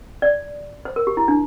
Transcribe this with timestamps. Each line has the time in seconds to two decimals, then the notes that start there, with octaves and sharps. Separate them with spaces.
0.22 D5
0.85 C5
0.96 A#4
1.07 G4
1.17 E4
1.28 D4